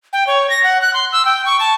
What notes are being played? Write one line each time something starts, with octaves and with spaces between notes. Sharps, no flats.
G5
C#5
A#6
F#5
F#6
C6
E6
G5
C#6
A5